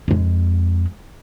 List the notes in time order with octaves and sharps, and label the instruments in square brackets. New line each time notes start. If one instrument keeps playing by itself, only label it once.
[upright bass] F2 G#3